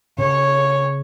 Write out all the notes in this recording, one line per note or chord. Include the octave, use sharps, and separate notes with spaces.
C#3 C#5